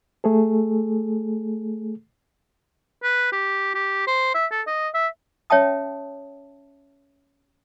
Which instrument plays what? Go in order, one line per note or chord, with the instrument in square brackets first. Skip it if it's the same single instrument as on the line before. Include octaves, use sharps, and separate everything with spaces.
[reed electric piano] A3 G#4 A4
[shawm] B4
G4
G4
C5
E5
A4
D#5
E5
[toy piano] C#4 C#5 E5 G5 A5 D#6